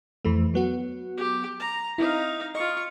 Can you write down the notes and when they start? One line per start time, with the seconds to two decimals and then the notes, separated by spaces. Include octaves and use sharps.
0.25 F2 E3 A3
0.54 F#3 B3 F#4
1.17 G4
1.60 A#5
1.98 C4 D#4 E4 F5
2.55 F4 D#5 C#6